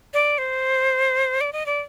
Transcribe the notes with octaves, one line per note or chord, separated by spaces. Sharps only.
D5
C5
D5
D#5
D5